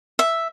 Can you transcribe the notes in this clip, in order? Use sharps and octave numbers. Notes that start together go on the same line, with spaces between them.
E5